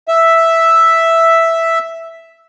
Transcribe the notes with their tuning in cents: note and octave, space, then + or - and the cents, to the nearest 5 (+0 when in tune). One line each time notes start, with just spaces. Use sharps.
E5 +0